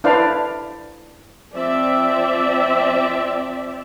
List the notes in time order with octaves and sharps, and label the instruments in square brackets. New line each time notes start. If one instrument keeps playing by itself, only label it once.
[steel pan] D4 E4 B4 C5 D5 F5
[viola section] F3 C4 D5 E5